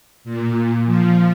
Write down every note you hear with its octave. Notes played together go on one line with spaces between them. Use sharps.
A#2
F3